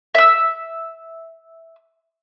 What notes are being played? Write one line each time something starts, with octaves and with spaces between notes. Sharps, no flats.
E5 E6